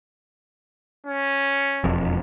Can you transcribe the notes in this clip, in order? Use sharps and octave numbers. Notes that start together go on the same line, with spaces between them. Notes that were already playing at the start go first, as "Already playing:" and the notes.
C#4
E1 F2